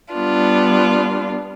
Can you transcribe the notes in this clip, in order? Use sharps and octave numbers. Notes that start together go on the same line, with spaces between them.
G3 B3 D4 F4